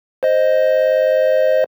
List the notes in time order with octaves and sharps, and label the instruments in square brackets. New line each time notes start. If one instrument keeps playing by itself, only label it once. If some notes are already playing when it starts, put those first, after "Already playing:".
[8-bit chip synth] C5 D#5